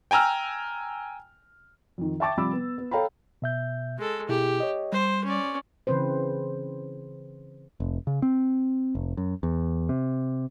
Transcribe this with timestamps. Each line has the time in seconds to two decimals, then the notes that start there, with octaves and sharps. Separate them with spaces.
0.11 G5 G#5 A#5 E6 F6
1.98 F2 D#3
2.20 E5 G5 A5 C#6 D6 A6
2.37 C3 F3 G3 B5 D6 E6
2.53 B3
2.78 B3
2.91 A4 C#5 F5 G5 A#5 B5
3.42 B2 E5 G6
3.98 G#3 A4
4.29 B2 E4 G4 G#4
4.60 C#5 D#5
4.93 G3 C5
5.25 C#4 D5
5.87 C#3 E3 C4 B4 C5
7.80 F1
8.07 C#3
8.22 C4
8.95 F1
9.17 F#2
9.43 E2
9.89 C3